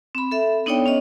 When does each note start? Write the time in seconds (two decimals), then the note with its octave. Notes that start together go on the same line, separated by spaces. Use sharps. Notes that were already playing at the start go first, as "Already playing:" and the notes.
0.15 C4 B5
0.31 A4 E5
0.66 B3 D4 D#4 C#5 D5 G5
0.86 C#4 C#5 D#5